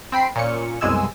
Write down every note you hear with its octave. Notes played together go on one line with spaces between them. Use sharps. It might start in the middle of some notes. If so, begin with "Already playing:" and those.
C4 G5 B5 C7
A#2 C#4 C#7
C2 F#2 B2 G#3 G#5 E6